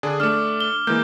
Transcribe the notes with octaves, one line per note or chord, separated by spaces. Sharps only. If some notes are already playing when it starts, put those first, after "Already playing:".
D3 D4 G#4
A3 D4 D6 F6
G7
E3 G#3 A#3 G6